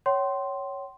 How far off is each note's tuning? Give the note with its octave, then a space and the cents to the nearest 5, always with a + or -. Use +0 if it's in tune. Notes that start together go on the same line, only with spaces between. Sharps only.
C#5 +0 G5 -45 C6 +0